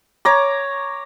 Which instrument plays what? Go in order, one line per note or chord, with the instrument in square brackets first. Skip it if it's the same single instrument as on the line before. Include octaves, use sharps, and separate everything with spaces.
[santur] C#5 A#5 D6